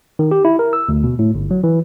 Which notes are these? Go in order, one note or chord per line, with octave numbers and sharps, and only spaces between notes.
D#3
G4
E4
A#4
E6
D2
B2
A2
G1
F#3
E3